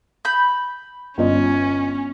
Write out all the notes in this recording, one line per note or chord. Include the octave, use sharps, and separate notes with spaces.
B5 G6
G1 C#4 F4 D#5